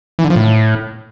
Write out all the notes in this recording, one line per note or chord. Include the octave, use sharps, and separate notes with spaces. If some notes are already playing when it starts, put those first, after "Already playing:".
E3
D3
F3
A2